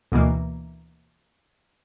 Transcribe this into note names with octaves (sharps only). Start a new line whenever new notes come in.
D2 B2 E3 A#3